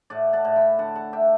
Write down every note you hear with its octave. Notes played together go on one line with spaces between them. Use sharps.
A2 D5 F#5
F#5 A5
A2
G5 B5
D3 F#5 A5
F#5 A5
D4 E5 G5